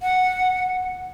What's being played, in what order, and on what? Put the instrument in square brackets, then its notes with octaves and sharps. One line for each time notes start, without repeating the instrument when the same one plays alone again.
[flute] F#5